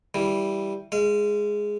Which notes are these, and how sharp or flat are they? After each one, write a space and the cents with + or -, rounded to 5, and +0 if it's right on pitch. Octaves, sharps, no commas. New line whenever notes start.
E3 +0 G3 +0
G#3 +0 F5 -35